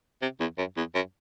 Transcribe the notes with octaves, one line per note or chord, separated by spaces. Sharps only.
C3
E2
F#2
E2
F#2